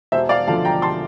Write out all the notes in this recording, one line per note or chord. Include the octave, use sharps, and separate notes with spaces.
E1 C5 E5
D5 F5
D2 D3 F3 F5 A5
G5 A#5
A5 C6